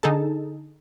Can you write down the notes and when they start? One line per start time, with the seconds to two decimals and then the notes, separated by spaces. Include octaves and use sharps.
0.03 D3 D#4 G#4 A4 A5